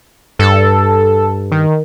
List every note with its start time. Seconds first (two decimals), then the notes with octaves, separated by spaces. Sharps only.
0.39 G2 A4
1.51 D#3